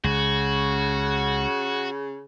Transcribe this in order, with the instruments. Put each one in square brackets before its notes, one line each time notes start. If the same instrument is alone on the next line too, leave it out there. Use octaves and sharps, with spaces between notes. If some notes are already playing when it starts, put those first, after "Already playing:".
[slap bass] C#2 [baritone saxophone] C#3 [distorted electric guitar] F#4